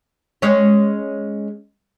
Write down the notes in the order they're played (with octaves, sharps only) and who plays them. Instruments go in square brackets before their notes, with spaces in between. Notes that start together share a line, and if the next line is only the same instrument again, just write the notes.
[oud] G#3 C#4 C#5